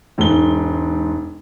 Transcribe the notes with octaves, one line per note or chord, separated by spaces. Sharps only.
E1 G#2 G7